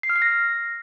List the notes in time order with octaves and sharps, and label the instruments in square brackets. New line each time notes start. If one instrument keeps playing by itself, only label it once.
[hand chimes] C7
F6
C7
A#6